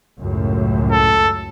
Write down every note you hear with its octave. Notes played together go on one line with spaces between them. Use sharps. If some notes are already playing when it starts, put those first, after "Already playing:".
C#2 F#2 A2
A4